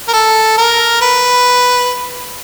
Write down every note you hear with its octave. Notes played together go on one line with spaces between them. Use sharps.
A#4
A4
A#4
B4